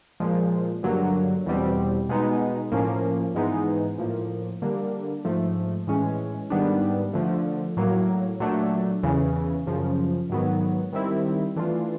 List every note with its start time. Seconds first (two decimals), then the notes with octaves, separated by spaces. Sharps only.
0.20 A#2 F3 G#3
0.83 G2 D3 F#3 A#3
1.46 E2 B2 G3 C4
2.09 B2 G#3 B3 D#4
2.72 A2 F3 A#3 C#4
3.35 G#2 E3 G#3 B3 D#4
3.98 A2 F3 A#3
4.62 D3 G3 A#3 D4
5.25 G#2 F3 A3
5.87 A2 E3 G#3 C#4
6.50 G#2 D#3 G3 B3 D4
7.14 D3 F3 A3
7.77 A2 F#3 A#3
8.40 A#2 F#3 A3 D4
9.03 E2 C#3 E3
9.66 F#2 C#3 F3
10.30 G#2 D#3 F#3 B3
10.93 D#3 G3 C4 E4
11.56 E3 A3 D4 F4